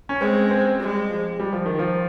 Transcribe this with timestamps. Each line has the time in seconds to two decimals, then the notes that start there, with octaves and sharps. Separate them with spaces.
0.09 C#4
0.21 G#3 C4
0.51 C4
0.80 G3 G#3
1.10 F3
1.40 G3
1.53 F3
1.66 D#3
1.79 F3